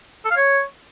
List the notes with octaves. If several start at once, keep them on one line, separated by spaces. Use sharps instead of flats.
A4
F5
C#5